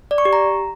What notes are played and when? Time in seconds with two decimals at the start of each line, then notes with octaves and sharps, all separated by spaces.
0.11 D5
0.18 C#6
0.25 G4
0.33 A#5